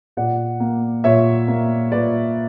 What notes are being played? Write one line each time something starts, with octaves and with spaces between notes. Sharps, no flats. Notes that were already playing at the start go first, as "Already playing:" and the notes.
A#2 D5 F#5
A#3
A#2 C#5 E5
A#3
A#2 B4 D5